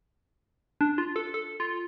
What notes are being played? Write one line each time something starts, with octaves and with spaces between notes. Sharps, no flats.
D4
F4
A4
A4
F4